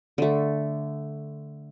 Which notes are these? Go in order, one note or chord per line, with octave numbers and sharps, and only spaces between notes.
D3 A3